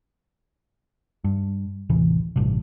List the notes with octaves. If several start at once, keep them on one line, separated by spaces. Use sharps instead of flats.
G2
A1 D#2 C3 E3
A1 G2 C3